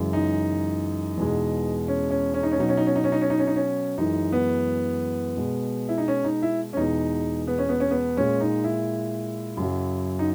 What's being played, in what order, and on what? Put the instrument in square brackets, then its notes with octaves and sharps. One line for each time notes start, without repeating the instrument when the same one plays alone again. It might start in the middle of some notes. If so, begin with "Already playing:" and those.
Already playing: [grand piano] F#2 C#3 E3 G#3
D#4
E2 B2 G#3
C#4
C#4
C#4
D#4
C#4
B2 F#3 D#4
C#4
D#4
C#4
D#4
C#4
D#4
C#4
D#4
C#4
D#4
C#4
F#2 E3 G#3 D#4
B3
B2 G#3
E4
D#4
C#4
D#4
E4
C#4
E2 B2 G#3 D#4
B3
C#4
B3
C#4
B3
A#2 G#3 C#4
D#4
E4
F#2 C#3 F#3
D#4